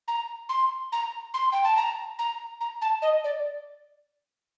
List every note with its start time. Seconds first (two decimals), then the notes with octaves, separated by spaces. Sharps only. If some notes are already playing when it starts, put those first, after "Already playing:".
0.08 A#5
0.49 C6
0.92 A#5
1.34 C6
1.52 G5
1.64 A5
1.77 A#5
2.19 A#5
2.61 A#5
2.82 A5
3.02 D#5
3.24 D5